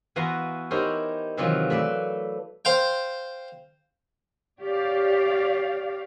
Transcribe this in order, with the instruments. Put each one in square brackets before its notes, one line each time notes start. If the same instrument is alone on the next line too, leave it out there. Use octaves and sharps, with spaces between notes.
[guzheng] E3 B3 F#4 F5 A#5 C6
D#4 E4 G4 A#4 C5 C#5
C3 D#3 E3 F#3 C4 F4
A3 B4 D5 E5
[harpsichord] C5 F5 G5
[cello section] G4 C#5 D5 F5